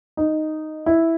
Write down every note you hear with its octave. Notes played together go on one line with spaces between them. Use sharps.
D#4
E4